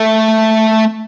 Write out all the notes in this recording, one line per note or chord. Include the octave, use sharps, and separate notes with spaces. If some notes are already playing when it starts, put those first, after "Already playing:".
Already playing: A3